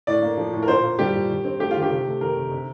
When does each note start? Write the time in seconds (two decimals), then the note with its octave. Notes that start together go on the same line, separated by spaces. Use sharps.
0.07 A2 D5
0.22 A#3
0.37 F3
0.53 A2
0.63 A#4
0.68 A#2 C5
0.83 A#3
0.99 G3 G4
1.14 A#2
1.29 D#3
1.45 C4
1.60 A3 G4
1.71 D#3 F4
1.82 G4
1.90 C3
2.06 A3
2.21 D#3 A#4
2.36 C3
2.52 C3